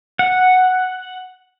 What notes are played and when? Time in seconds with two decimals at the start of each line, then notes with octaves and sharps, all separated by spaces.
0.19 F#5